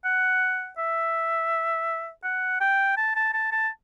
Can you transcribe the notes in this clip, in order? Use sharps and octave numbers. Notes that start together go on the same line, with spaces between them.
F#5
E5
F#5
G5
A5
A5
A5
A5